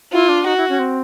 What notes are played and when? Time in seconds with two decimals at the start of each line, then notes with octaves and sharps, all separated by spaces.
0.12 E4 F4
0.29 D4
0.46 D#4 F#4
0.57 E4
0.69 C#4
0.79 C4